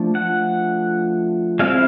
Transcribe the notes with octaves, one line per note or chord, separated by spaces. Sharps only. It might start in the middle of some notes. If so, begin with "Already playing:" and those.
Already playing: F3 A3 D4
F#5
G#3 C4 E4 F5